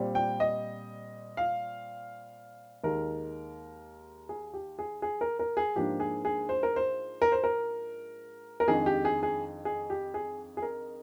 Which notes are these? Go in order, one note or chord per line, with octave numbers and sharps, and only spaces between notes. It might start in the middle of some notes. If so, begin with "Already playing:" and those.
Already playing: A#2 G3 C4
G5
D#5
F5
D#2 D#3 G#3 A#4
G#4
G4
G#4
G#4
A#4
A#4
G#4
G#2 F3 A#3 D4 G4
G#4
G#4
C5
A#4
C5
A#4
C5
A#4
A#4
F2 D#3 G#3 D4 G#4
G4
G#4
G#4
G#4
G4
G#4
G#4
A#4